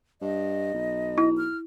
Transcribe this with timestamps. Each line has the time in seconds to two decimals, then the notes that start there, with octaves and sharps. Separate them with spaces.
0.22 G2 D#5
0.74 B1
1.18 E4
1.37 F6